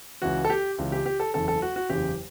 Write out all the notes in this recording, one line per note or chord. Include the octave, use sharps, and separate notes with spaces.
C#2 C#3 E3 F#4
A4
G4
C#2 C#3 E3
G4
G4
A4
F#1 E2 C#3 A4
A4
F#4
F#4
F#1 E2 C#3 G4